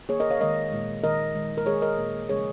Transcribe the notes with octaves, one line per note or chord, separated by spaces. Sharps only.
D#3 A#3 G#4 C#5
A#4 D#5
C#5 F5
D#3 G#3 A#4 D#5
A#2 G#3
D#3 A#3 A#4 D#5
D#3 G#3
A#4
D#3 G#3 G#4 C#5
A#4 D#5
A#2 A#3
C#3 F3 G#3 G#4 C#5